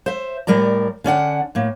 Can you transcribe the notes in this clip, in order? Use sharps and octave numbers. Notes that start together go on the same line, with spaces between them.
C5 E5
A2 G3 A#4 D5 A#5
D3 C#4 D5 F#5
A2 A#3